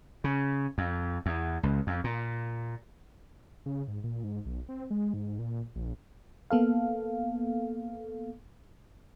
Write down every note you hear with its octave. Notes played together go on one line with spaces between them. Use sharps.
C#3
F2
E2
C#2
F2
A#2
C#3
G#2
A#2
G#2
B1
C4
G#3
G#2
A#2
A#1
A#3 B3 A4 F5